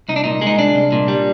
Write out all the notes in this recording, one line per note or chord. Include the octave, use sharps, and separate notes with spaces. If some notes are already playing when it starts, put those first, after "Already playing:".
C2 D#4
D4
A#2 D#4
G#3
D#4
C2 D4
C2
A#2
G3